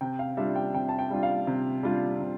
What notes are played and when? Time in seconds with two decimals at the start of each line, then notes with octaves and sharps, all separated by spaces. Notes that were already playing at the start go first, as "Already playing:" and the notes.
0.01 C3 G5
0.19 F5
0.37 G3 D4 F4 E5
0.56 G5
0.74 C3 G5
0.89 A5
0.99 G5
1.10 G3 D4 F4
1.23 F5
1.47 C3
1.83 G3 D4 F4
2.20 C3